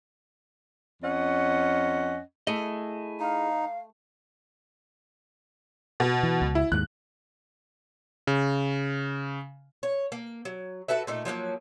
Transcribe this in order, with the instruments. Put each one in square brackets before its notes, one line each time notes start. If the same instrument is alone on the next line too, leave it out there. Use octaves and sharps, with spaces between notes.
[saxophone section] F2 C#4 D#5 F#5
[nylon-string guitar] A3 [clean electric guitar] E4 G#4 D#5
[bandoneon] D#4 [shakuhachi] F5
[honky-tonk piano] B2
[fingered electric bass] E3
C#2
[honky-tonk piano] E4
[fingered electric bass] D#2 G#2 [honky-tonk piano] F#6
[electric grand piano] C#3
[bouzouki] C#5
A#3
F#3
F#4 A4 B4 E5
A#2 A3 D#4
F3 F#3 G#3 A#3